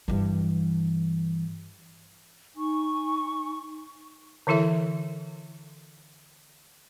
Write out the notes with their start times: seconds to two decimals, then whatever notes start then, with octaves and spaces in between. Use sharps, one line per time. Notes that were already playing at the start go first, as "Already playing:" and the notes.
0.08 G2 E3
2.56 D#4 G#5 C#6
4.47 D3 E3 E4 A4 E5